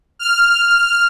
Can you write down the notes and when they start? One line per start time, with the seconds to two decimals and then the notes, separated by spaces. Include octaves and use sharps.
0.19 F6